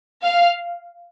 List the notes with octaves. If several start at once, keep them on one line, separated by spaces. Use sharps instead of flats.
F5